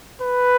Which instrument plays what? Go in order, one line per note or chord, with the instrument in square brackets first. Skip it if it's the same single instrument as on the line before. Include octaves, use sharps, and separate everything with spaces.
[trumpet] B4